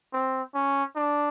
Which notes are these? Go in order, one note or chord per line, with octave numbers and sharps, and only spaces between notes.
C4
C#4
D4